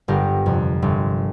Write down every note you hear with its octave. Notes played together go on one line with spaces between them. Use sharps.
G1 G4 A#4
F2 C3
G1